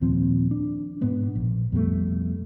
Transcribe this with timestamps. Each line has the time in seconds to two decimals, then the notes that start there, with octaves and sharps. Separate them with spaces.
0.01 D#2 A#2 F3 C4
0.51 D4
1.01 G#2 B2 B3 D4
1.36 A#1
1.72 F2 B2 G3 A3